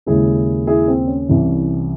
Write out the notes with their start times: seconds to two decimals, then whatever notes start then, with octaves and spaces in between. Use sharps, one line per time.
0.06 D#2 C#3 G#3 E4 G#4
0.67 E4 G#4
0.88 C4
1.07 C#4
1.29 C2 C3 E3